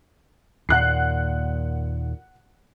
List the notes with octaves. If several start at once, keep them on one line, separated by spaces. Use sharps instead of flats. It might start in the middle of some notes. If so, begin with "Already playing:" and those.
D#2 A#2 F#5 F#6 C7